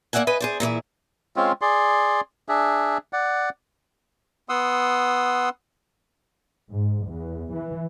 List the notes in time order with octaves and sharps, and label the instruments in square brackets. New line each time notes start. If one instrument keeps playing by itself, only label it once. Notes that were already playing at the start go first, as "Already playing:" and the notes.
[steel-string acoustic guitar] A#3 D5 E5 F#5 G#5
B4 D#5 G#5
G#4 C5 D5
A#2 E3 E4 G#4
[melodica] G#3 C4 C#4 F4
G#4 D5 C6
D4 G#4 E5
D5 F#5
[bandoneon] B3 F#5 C6 D#6 E6
[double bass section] G#2
E2
E3